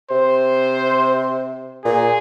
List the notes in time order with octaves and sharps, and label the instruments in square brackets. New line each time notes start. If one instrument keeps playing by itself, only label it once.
[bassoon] C3 [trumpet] C5
[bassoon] A#2 [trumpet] G#4